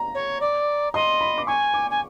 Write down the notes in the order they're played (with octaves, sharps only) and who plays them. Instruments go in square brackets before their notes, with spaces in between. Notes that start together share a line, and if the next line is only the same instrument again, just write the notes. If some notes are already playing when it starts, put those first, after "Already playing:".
Already playing: [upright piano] A#5
[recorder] C#5
D5
[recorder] D#5 [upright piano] C6
[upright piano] B5
D6
[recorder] G#5 [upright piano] C#6
[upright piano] D6
[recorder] G#5